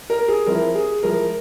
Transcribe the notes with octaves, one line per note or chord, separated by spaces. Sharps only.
A#4
G#4
F3 C4 E4 A#4
G#4
F3 G#3 E4 A#4